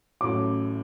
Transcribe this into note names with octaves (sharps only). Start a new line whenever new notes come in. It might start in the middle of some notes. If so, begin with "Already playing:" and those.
A1 A2 F#3 D6